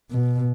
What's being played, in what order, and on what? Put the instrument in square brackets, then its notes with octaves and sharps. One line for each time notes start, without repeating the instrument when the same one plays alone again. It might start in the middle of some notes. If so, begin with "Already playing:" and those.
[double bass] B2